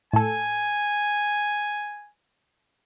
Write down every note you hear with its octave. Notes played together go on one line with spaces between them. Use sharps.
A2 A4 G#5